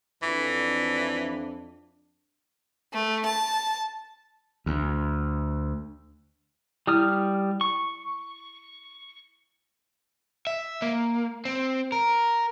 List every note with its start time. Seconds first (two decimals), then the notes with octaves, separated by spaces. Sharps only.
0.23 F2 E3 D4
2.93 A3
3.26 A5
4.66 D2
6.87 G3 E4 D#6 F6
7.61 C#6
10.47 E5
10.82 A#3
11.45 C4
11.92 A#4